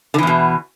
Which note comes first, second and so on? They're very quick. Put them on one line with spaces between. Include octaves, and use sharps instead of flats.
D3 E3 E2 B2